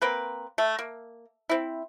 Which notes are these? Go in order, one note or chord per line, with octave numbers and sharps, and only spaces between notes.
A#3 C4 B4
A3
A#3
C4 E4